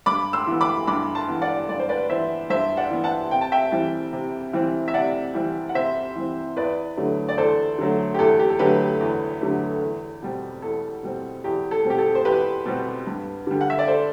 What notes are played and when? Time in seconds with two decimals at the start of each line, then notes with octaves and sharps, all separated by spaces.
0.06 G2 B5 D6
0.33 C6 E6
0.47 E3 B3
0.61 B5 D6
0.87 G2 B5 D6
1.15 A5 C6
1.29 E3 B3
1.42 D5 F#5
1.69 G2 D5
1.79 C5
1.89 B4 D5
2.10 E3 B3 C5 E5
2.50 G2 C5 E5
2.77 D5 F#5
2.91 E3 B3
3.04 F#5 A5
3.31 C3 G5
3.41 A5
3.52 E5 G5
3.72 E3 G3 C4
4.13 C3
4.53 E3 G3 C4
4.88 E5
4.94 C3 D5 F#5
5.35 E3 G3 C4
5.69 F#5
5.75 C3 C5 E5
6.16 E3 G3 C4
6.56 E2 B4 D5
6.97 D3 F#3 A3
7.29 D5
7.38 E2 A4 C5
7.78 D3 F#3 A3
8.14 G4
8.19 E2 A4
8.39 G4
8.49 A4
8.59 D3 F#3 A3 G4 B4
9.01 E2
9.41 D3 F#3 A3
9.81 E2
10.22 B2 G3 C4
10.62 E2 A4
11.03 B2 G3 C4
11.44 E2 G4
11.71 A4
11.85 B2 G3 C4
11.90 G4
11.98 A4
12.15 C5
12.25 E2 G4 B4
12.66 B2 G3 C4
13.07 G2
13.47 D3 G3
13.61 F#5
13.70 E5
13.79 D5
13.88 A4 C5